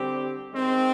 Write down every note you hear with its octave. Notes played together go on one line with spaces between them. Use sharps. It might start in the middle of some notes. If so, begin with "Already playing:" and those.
Already playing: D3 G3 C4 G4
D#3 G#3 C4